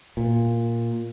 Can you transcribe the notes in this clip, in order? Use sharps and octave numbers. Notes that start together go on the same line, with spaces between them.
A#2